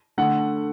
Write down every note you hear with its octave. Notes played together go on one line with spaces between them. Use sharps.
D3 A3 F#5